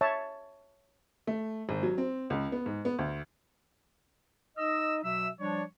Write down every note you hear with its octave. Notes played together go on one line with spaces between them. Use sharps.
C#5 E5 A5
A3
G#1
F#3
C4
C#2
B3
G#2
B3
D2
D#4 D#5 E6
B2 F#3 E5 E6
F3 G3 D4 C#5